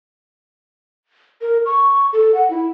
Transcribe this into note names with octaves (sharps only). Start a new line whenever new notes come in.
A#4
C#6
A4
F#5
E4